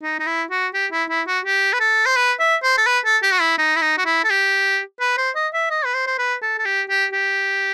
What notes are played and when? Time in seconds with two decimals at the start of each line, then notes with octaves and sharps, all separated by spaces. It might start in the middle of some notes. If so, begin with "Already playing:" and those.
0.03 D#4
0.20 D#4
0.27 E4
0.51 F#4
0.74 G4
0.92 E4
1.09 E4
1.27 F#4
1.45 G4
1.73 B4
1.80 A4
2.06 C5
2.16 B4
2.39 E5
2.63 C5
2.77 A4
2.87 B4
3.05 A4
3.23 G4
3.32 F#4
3.40 E4
3.58 D#4
3.76 E4
3.82 D#4
3.98 F#4
4.05 E4
4.24 A4
4.29 G4
5.00 B4
5.18 C5
5.35 D#5
5.53 E5
5.71 D#5
5.85 B4
5.94 C5
6.07 C5
6.18 B4
6.42 A4
6.59 A4
6.65 G4
6.89 G4
7.13 G4